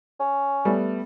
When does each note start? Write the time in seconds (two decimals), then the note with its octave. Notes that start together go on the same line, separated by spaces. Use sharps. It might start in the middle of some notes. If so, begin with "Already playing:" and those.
0.20 C#4
0.65 G3 A3 B3